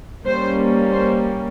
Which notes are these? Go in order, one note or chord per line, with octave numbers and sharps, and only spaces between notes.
G3 A#3 C#4 C5
C5